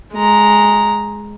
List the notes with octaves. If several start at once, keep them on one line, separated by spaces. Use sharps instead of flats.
G#3 A#5